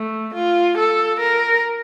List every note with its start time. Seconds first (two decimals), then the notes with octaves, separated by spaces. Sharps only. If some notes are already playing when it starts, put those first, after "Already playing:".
Already playing: A3
0.34 F4
0.77 A4
1.20 A#4